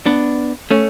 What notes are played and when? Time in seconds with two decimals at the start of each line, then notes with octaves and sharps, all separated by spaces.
0.06 B3 D4
0.71 A3 C#4